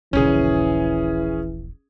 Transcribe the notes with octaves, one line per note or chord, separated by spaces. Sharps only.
D#1 A#1 C#3 E3 C#4 G#4